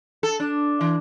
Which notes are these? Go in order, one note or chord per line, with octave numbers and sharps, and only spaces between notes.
A4
D4
E3